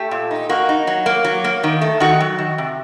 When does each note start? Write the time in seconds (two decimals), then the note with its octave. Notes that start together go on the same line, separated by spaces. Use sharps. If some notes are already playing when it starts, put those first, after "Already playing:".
Already playing: A3 G4
0.11 A#2
0.31 D#4
0.49 A#3 F#4
0.69 D#4
0.87 F#3
1.06 A#3
1.25 F#3
1.44 A#3
1.63 D#3
1.81 A3
2.00 D#3 F#4
2.20 F#3
2.38 D#3
2.58 C3